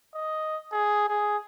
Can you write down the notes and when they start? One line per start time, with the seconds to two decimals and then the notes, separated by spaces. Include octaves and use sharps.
0.15 D#5
0.72 G#4
1.08 G#4